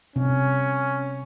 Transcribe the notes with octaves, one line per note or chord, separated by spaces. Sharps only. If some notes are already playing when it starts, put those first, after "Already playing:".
C3 C#4